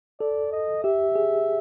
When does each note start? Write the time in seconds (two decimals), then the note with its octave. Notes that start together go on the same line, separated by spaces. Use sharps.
0.20 A4 D5
0.52 D#5
0.84 G4 E5
1.15 G#4